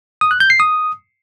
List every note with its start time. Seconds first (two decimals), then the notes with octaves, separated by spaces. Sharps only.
0.21 D#6
0.31 F#6
0.40 G6
0.50 C7
0.60 D#6